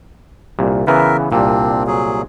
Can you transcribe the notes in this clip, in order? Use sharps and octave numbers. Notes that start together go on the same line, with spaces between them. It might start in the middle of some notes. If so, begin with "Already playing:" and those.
C2 A#2
C#3 E3 B3 A#4 E5
C2 A#2 C4 D4
F#3 G#4